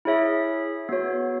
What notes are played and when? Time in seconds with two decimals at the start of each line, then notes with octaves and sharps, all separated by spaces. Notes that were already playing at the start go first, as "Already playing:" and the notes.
0.05 E4 G#4 C#5 E5
0.89 B3 F#4 C#5